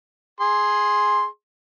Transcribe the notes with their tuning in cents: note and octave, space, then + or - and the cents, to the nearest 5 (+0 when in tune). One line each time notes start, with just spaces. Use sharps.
G#4 +0 C6 +5